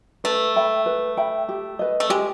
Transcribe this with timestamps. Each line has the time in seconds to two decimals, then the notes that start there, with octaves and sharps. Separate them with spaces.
0.24 A3 B4
0.56 E5 G5 B5
0.86 B4
1.17 E5 G5 B5
1.49 G4
1.79 B4 D#5
2.00 A3
2.10 G#3 G4